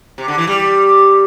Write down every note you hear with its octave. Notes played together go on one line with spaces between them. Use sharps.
C3
D3
E3
G3